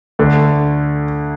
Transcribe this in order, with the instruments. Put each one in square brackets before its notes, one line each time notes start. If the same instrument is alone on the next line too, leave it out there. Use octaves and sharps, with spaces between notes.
[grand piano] D2 D3 A3